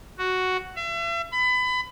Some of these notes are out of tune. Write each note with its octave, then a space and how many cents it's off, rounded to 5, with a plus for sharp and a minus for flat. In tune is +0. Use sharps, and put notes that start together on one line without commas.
F#4 +5
E5 +40
B5 +25